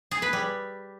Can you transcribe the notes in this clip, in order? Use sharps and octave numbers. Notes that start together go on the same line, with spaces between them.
G#4
B4
G3